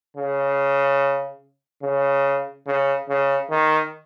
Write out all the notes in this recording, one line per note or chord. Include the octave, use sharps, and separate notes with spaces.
C#3
C#3
C#3
C#3
D#3